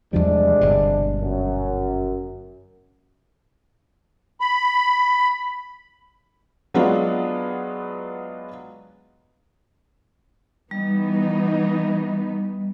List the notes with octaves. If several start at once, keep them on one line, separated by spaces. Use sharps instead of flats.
E2 C3 F3 G3 G#3 D4
G1 B2
F#2
B5
F#3 G#3 B3 D4 F4
E3 G3 B3 D#4